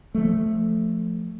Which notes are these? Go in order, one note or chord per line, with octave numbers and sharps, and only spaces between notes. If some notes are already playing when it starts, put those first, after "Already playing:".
F3 A3